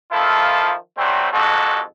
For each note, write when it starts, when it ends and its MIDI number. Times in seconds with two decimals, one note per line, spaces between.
0.12 0.73 51
0.12 0.73 53
0.12 0.73 64
0.12 0.73 65
0.12 0.73 69
0.97 1.28 54
0.97 1.28 55
0.97 1.28 57
0.97 1.28 60
1.33 1.81 36
1.33 1.81 41
1.33 1.81 44
1.33 1.81 66
1.33 1.81 69